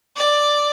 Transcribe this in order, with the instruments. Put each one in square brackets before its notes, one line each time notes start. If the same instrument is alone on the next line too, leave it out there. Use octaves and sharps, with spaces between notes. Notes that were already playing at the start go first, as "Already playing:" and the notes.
[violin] D5